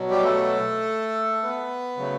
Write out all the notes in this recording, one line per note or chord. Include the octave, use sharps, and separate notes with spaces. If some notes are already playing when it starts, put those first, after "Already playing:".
Already playing: B2 F#3
G3 G4
A3 A4
B3 B4
C#3 F#3 A3